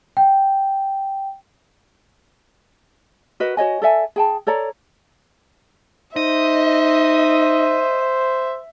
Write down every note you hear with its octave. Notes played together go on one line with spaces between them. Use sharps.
G5
F#4 A#4 B4 D#5
F#4 C#5 D#5 G#5
A4 D5 E5 G#5
G#4 G5 A5
A4 C#5 D5 A#5
D#4 C5 D#5 E5